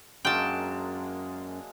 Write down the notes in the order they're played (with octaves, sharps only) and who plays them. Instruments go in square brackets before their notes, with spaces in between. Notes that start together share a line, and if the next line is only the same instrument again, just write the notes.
[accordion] F#2 [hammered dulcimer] F#3 A#3 [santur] G#3 D4 F5 [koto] G5 A5